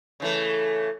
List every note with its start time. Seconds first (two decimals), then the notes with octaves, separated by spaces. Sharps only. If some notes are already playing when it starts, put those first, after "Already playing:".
0.20 C#3 E3 A3